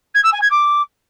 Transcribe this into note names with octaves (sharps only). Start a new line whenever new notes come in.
G#6
E6
G#5
G#6
D6